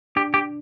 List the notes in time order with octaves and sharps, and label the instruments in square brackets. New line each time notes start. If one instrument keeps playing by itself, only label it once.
[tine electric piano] D4 [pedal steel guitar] G4
[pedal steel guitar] G4